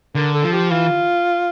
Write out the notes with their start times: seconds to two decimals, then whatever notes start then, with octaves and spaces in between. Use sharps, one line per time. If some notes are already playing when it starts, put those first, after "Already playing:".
0.15 D3 A#4
0.34 A4
0.43 F3
0.53 G4
0.71 E3 F4